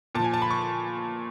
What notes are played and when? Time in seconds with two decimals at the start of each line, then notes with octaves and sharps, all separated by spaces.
0.15 A#2 A5
0.19 F3 G#5
0.34 A5
0.42 B5
0.51 C#6